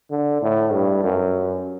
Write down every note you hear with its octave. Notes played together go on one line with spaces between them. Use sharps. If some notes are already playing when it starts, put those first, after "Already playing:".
D3
A2
G2
F#2